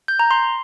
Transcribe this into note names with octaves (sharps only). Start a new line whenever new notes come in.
G6
A#5
C6